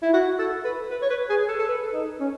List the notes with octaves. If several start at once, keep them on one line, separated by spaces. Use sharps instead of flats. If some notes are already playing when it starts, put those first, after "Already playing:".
E4
F#4
A4
B4
B4
C#5
B4
G#4
A4
A4
B4
D#4
C#4